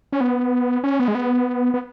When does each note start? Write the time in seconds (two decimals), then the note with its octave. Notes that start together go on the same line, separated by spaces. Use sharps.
0.12 C#4
0.21 B3
0.84 C#4
1.00 B3
1.08 G#3
1.15 B3
1.74 B3